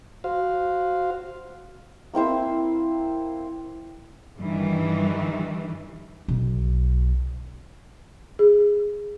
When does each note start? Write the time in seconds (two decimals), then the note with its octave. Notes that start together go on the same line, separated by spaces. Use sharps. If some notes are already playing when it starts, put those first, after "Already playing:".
0.24 F#4 C5 F5
2.14 A#3 C4 E4 C5
4.38 G2 D#3 E3 G3
6.28 B1
8.39 G#4